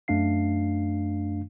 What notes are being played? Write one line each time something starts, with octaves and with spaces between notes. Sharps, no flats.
F#2 A3 D4 F5 C7